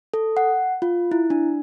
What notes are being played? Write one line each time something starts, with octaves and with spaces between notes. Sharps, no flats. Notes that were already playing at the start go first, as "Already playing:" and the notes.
A4
F#5
F4
E4
D4